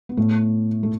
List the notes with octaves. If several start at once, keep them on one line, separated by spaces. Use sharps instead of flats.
B3
A2 A3
A3